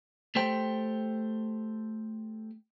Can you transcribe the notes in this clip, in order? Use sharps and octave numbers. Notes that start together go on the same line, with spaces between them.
A3 G4 C5 G5